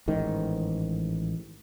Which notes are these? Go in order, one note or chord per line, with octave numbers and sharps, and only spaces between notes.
A1 G#2 D#3